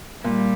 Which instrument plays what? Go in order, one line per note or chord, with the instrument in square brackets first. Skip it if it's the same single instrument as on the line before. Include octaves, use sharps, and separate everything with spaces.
[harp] A#2 [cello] G3